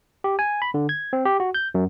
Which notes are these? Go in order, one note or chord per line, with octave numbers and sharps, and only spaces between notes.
G4
G#5
B5
D3
G#6
C4
G4
F#4
G6
F#2